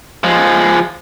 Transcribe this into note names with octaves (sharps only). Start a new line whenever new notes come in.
F3 G#3